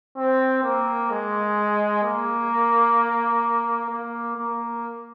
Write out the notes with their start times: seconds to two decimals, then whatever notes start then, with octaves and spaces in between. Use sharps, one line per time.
0.17 C4
0.64 A#3
1.11 G#3
2.03 A#3
3.90 A#3
4.37 A#3